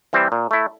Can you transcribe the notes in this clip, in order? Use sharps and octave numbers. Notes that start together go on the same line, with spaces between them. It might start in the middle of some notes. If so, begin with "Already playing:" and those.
E3 G3 C4
A#2
A3 E4